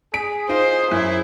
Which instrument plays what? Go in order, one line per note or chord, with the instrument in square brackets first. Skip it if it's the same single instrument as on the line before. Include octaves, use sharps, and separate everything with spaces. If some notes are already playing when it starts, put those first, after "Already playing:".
[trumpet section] G#4 [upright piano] B6 D7
[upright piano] D#4 F4 [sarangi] C5
[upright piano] F#2 [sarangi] E4